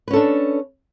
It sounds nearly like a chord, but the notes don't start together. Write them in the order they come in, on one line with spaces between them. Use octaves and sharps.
B4 C#4 A4 D4